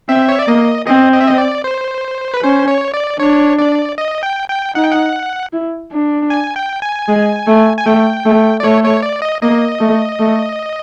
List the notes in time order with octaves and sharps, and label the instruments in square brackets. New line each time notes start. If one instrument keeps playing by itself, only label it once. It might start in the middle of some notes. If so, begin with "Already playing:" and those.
[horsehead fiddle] C4 [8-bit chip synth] E5
[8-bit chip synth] C#5
D5
[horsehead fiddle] A#3 [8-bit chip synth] D#5
[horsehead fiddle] C4 [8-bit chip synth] D#5
[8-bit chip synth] D#5
E5
D#5
D5
C5
B4
[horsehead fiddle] C#4 [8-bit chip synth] C5
[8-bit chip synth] C#5
D5
[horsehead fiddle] D4 [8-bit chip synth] C#5
[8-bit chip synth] D5
D#5
G5
G5
[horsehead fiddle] D#4 [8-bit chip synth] F#5
[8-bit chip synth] G5
F#5
[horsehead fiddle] E4
D4
[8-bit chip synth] G#5
G5
G#5
[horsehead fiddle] G#3
A3
[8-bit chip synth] G#5
[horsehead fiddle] A3 [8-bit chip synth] G5
[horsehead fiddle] A3
[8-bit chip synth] D5
[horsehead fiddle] A3 [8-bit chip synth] C#5
[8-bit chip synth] C#5
D5
D#5
[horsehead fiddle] A#3 [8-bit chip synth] D#5
[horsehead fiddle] A3
A3